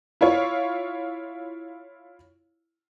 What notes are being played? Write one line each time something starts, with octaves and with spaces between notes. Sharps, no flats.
E4 F4 C#5